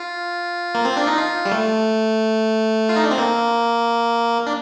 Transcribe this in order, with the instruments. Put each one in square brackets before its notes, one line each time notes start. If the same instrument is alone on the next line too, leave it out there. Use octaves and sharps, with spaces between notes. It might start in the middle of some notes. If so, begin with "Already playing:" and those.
Already playing: [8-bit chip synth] F4
A#3
C4
D4
D#4
F4
G3
A3
F4
D#4
D4
C4
A#3
D4